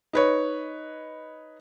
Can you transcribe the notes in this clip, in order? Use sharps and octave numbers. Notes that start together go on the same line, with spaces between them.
D#4 B4 C#5